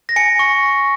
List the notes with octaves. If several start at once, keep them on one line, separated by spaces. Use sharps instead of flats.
A#6
G#5 C#7
C#6